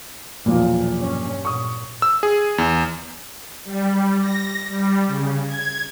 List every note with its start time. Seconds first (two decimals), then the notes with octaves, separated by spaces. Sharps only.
0.46 B1 E2 A#2 F3 A#3
0.97 G2 C#4
1.45 A#2 C#6 D#6
2.02 E6
2.23 G#4
2.58 E2
3.64 G3
4.20 A#6
4.68 G3
5.07 C#3
5.47 G#6